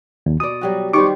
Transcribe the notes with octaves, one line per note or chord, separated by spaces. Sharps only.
D#2
B2 D5 D#6
F#3 G3 F#4
D#3 G3 G4 C5 C#6 D6